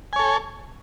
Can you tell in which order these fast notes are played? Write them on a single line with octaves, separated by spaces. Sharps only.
G#5 C#5 A4